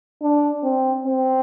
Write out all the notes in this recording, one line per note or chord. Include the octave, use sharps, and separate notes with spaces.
D4
C4
C4